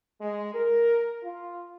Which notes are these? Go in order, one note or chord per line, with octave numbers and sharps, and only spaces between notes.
G#3
A#4
F4